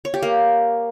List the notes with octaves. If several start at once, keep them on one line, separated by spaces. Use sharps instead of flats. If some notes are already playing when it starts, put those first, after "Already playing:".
C#5
G4
A#3